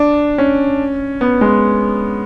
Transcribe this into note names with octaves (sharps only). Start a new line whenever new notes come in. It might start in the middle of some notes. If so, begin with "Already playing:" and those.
Already playing: D4
C#4
B3
G#3